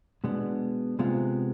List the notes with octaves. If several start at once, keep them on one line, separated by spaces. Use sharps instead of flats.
B2 G#3 B3 D4
C3 G#3 B3 F4